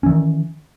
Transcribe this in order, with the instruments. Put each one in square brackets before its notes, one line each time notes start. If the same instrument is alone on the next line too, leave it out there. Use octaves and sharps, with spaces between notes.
[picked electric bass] C#4
E3
D#3